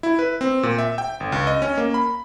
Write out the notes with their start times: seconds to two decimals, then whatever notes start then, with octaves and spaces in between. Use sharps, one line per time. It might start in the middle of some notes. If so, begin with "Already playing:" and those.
0.03 E4
0.19 B4
0.41 C4
0.63 A#2
0.78 E5
0.98 G5
1.20 G1
1.32 C#2
1.47 D#5
1.62 C#4
1.78 A#3
1.94 B5